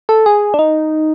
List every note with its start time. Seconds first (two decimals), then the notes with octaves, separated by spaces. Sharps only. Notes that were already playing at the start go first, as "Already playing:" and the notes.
0.09 A4
0.26 G#4
0.54 D4
0.59 D#4